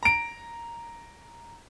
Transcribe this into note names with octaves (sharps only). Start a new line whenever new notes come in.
A#5 D7